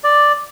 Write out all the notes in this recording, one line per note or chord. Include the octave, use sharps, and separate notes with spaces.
D5